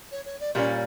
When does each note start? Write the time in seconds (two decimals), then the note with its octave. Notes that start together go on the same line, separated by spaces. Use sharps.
0.11 C#5
0.25 C#5
0.40 D5
0.55 A#2 G3 A#3 C#4 D5